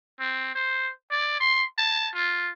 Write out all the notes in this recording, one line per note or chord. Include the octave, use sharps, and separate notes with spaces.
C4
C5
D5
C6
A5
F4